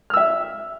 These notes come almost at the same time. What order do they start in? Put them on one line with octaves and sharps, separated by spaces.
F6 E6 E5